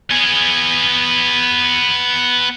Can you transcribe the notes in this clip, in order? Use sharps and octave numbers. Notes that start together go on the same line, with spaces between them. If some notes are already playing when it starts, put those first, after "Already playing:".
B3 G#4